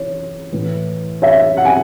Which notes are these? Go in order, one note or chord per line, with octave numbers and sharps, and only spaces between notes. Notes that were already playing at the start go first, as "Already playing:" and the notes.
Already playing: E3 C#5
A2 E3
C#5 E5
F#5
G#5